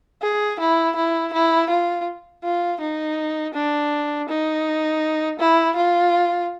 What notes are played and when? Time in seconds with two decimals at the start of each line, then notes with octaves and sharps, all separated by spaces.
0.22 G#4
0.60 E4
0.96 E4
1.33 E4
1.70 F4
2.44 F4
2.81 D#4
3.55 D4
4.29 D#4
5.39 E4
5.76 F4